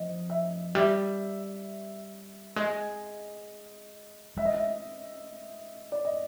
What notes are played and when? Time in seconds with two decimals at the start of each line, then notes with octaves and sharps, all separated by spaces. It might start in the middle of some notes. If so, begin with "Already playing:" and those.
Already playing: F3 D#5
0.30 E5
0.75 G3 E5
2.56 G#3 D#5
4.37 G#3 E5
4.45 D#5
4.54 E5
5.92 D5
6.05 D#5